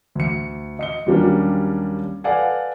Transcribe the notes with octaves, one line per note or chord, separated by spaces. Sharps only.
D2 C#7
D#5 C#7 G7
D#2 F#3 G3 A#3 C#4 D4
A4 B4 D5 F5 F#5 G#5